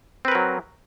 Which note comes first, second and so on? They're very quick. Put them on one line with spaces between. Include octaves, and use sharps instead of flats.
C4 B4 A#4 F#3